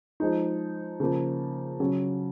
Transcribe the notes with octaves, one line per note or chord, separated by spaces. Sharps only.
F3 G#3 D#4
C#3 F3 A#3
C#3 F#3 C#4